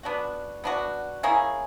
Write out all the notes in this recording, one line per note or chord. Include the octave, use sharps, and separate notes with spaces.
B3 D4 F#4
B3 D4 F#4
A#3 C#4 E4 G#4